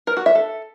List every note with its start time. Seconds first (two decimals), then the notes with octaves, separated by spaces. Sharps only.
0.07 A#4
0.17 F#4
0.26 E5
0.35 A4